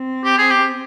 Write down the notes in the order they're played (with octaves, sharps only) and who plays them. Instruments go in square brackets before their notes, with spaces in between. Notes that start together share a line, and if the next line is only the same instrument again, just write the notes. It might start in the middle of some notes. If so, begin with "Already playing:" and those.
Already playing: [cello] C4
[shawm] G4
G#4
G4